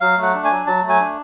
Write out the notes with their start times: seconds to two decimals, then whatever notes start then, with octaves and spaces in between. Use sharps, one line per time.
0.01 F#3 F5
0.17 A3
0.22 F#5
0.34 D4
0.45 G#5
0.50 F#3
0.67 F#3 A5
0.83 A3
0.89 G#5
1.00 D4